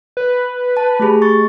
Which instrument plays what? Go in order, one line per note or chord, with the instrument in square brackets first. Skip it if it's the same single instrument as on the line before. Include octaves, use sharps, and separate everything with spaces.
[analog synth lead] B4
[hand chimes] A5
A3 G4 G#4
C#6 A6